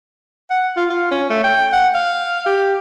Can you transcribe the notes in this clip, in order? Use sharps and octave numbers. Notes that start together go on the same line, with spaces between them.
F#5
F4
F4
C#4
A3
G5
F#5
F5
G4